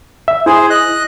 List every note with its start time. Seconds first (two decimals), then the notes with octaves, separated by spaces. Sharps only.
0.28 E5
0.46 E4 G#4 C5
0.70 D#5 F#6